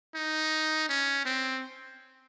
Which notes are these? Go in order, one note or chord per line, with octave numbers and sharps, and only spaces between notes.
D#4
C#4
C4